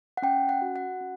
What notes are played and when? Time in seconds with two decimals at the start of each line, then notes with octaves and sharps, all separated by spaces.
0.17 F#5
0.22 C#4 G5
0.49 F#5
0.62 F#4
0.76 F#5
1.01 C#4